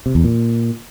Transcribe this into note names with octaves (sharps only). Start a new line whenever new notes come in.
C3
E2
A#2